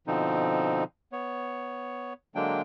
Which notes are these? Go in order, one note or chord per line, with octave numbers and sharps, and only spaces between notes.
B2 D3 F3 C4 D#4
B3 C#5
D3 F#3 G#3 A#3 D4 G5